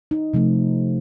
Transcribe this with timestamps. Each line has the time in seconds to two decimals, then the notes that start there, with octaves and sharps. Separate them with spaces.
0.11 D#4
0.34 C3 F3 A3